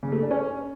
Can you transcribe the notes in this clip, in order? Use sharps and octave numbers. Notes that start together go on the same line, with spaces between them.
C#3
A3
D4
C#4